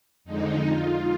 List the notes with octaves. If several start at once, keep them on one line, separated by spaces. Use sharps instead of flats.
F2 D3 G#3 D#4
F4